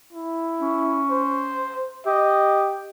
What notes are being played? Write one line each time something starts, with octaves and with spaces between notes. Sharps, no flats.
E4
C#4
C5
G4 D#5